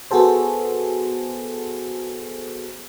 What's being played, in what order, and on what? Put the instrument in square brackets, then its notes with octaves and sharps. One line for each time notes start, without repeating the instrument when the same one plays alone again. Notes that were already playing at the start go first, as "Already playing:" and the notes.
[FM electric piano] B3 F#4 G#4 A4 C5